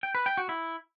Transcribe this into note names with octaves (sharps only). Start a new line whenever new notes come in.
G5
B4
G5
F#4
E4